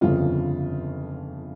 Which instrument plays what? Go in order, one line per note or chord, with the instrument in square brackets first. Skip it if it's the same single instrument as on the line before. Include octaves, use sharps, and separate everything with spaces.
[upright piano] G1 F2 C#3 F3 F4